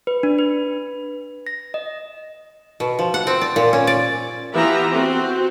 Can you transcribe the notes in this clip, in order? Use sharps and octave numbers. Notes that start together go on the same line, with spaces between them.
B4
D4
B4
A#6
D#5
B2
F3
F#5
C4
D5
A#2
C#4
D5
E3 B3 F4 G4 E5 A#5
C4 F#4